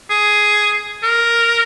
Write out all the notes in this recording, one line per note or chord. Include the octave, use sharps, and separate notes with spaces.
G#4
A#4